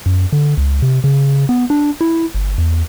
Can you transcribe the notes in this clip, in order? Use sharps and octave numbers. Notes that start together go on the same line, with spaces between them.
F#2
D3
C#2
C3
C#3
B3
D4
E4
G1
E2